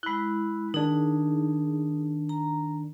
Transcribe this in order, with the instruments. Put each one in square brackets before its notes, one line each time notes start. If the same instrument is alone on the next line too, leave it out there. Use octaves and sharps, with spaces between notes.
[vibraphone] G#3 E4 [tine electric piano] B5 F#6
[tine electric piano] D#3 D4 [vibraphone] D#4 G#4
[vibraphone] A#5